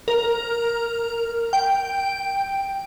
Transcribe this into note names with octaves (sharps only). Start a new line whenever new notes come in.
A#4
G5